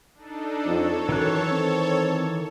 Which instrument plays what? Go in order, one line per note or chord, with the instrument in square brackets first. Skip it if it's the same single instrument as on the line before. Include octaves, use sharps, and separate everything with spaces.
[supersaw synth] D4 D#4 A4
[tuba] F2 [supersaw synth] A4 C#5
[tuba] F#2 [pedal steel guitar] D#3 E3 F#6
[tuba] C4